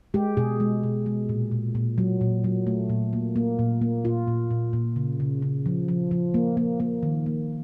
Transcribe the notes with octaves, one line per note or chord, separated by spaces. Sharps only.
G#3 G4
B2 G#4
G#3
B2
G#3
A#2
A#2
A#2
F#3
A#2
F#3
A3
A#2
A#3
A#3
A#2
A#3
A#2 F4
A#2
A#2
A#2
C#3
C#3
C#3
F3
F3
F3
A#3
A#3
A#3
D#3
A#3